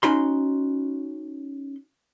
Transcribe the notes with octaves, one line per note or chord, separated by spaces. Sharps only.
C#4 D#4 F#4 B5 C6